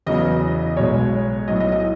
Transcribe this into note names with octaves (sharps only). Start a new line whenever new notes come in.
E2 C#3 F#3 B3 D#5
B1 B2 G#3 C#5
B1 A2 F#3 D#5
D#5
D#5